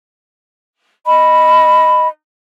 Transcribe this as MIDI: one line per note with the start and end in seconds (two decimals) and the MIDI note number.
1.05 2.07 75
1.05 2.07 83